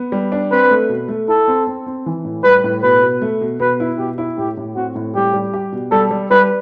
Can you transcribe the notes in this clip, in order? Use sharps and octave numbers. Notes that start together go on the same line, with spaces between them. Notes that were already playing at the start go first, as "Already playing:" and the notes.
Already playing: B3
G3
D4
C4 B4
A3
B2
A3
E4 A4
C4
C4
C4
E3
A2
G3 B4
A2
B2 B4
B2
A3
B2
B2 B4
E4
B2 G4
E4
A2 G4
A2
C4 F#4
A2
G3 G4
G3
G4
B2
G3 A4
G3
G3 B4